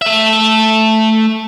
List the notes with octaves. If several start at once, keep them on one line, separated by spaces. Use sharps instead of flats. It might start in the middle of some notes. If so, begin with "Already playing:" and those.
A3 E5